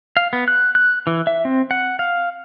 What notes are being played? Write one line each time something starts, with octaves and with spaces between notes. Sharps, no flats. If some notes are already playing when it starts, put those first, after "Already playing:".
F5
B3
F#6
F#6
E3
E5
C4
F#5
F5